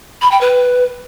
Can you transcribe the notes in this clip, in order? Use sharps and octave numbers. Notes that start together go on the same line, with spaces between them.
B5
G5
B4